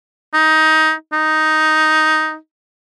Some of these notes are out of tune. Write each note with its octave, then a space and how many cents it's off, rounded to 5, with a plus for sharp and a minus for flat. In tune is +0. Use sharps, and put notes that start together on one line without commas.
D#4 +15
D#4 +5